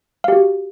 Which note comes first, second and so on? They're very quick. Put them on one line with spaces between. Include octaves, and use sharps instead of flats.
F5 G4 F#4